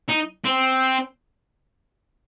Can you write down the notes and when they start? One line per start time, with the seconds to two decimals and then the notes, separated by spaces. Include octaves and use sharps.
0.09 D#4
0.44 C4